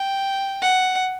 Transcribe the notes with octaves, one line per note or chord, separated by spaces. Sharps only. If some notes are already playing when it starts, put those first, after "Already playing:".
Already playing: G5
F#5